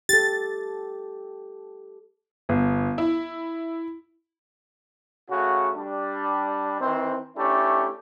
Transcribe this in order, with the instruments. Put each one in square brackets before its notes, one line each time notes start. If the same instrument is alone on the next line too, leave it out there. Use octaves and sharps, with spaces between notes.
[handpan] G4 A4 [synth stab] A6
[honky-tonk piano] G1
E4
[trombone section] C#3 A3 F#4
G3 D4
D#3 E3 C4
A3 C#4 D4 E4 G4